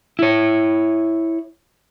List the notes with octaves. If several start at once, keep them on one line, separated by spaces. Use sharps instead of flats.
E4 C#5